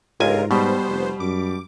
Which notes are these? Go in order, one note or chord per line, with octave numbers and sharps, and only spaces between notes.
G1 C#2 G#2 F4 A#4 G#5
B2 G3 B3 C5
F1
F#2 D6